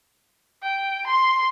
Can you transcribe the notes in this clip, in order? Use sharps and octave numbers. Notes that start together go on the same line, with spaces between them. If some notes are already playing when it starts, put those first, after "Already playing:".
G5
C6